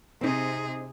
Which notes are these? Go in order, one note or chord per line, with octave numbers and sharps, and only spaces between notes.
C3 C4 D#4 G#4